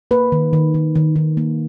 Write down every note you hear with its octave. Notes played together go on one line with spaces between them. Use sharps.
A#3 B4
D#3
D#3
D#3
D#3
D#3
A#3